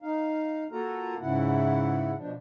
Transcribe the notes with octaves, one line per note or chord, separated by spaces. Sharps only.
D#4 F5
A#3 F4 F#4 A4 A#4 A#5
G#2 C#3 E4 F#5
B2 F3 D4